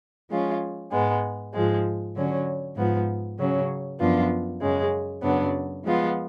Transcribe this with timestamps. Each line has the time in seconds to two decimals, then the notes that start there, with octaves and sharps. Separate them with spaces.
0.30 F3 G#3 C#4 F4
0.91 G#2 G#3 B3
1.53 G#2 F3 G#3
2.16 D3 F#3 C#4
2.76 G#2 F3 B3
3.38 C#3 F#3 C#4
4.00 F#2 F3 B3 D4 F4
4.61 F#2 C#3 G#3
5.22 F#2 C#3 F#3 B3 D4
5.84 F3 G#3 B3 F4